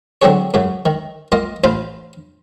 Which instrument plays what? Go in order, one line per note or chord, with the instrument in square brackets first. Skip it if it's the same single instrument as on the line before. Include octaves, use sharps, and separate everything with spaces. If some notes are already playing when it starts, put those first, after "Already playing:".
[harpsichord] D3 F#3 C4 D4 G#4 C#5
F#2 C#3 F#3
D#3
A#3 F4 D#5
A1 F4 C5 B5